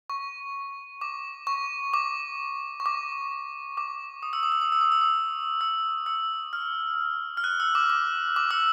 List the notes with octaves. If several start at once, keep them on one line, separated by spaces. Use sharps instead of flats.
C#6
D6
C#6
D6
C#6
D6
D6
D#6
E6
D#6
E6
D#6
E6
D#6
E6
D#6
E6
E6
F6
F6
F#6
E6
D6
D6
D6
E6